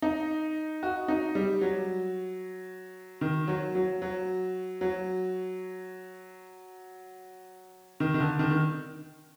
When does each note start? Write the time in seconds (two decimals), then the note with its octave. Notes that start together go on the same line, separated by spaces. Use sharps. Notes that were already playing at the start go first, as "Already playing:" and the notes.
0.02 D#4
0.83 F#4
1.08 D#4
1.35 G3
1.61 F#3
3.21 D#3
3.48 F#3
3.75 F#3
4.02 F#3
4.81 F#3
8.00 D#3
8.14 D#3
8.20 D3
8.39 D#3
8.51 D#3